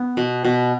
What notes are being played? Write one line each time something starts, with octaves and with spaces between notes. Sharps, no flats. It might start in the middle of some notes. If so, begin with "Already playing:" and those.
Already playing: B3
B2
B2